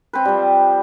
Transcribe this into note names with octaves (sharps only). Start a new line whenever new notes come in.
C4 B4
F3 G3